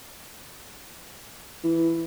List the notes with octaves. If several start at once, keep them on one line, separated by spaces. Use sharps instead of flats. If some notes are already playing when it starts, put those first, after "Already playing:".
E3